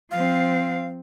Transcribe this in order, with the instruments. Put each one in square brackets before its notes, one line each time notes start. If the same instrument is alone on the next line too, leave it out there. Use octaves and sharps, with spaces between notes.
[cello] F3 C4 [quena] F5